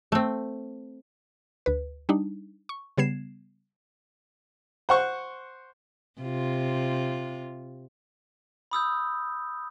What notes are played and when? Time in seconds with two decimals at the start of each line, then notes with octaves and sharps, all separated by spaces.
0.12 A3 C4
1.66 D2 B4
2.09 G3 D4 D#4
2.69 C#6
2.97 C#3 G3 B3 G#6 C7 E7
4.89 C5 F#5 C#6
6.20 C3 F4
8.71 B5 D#6 E6 G6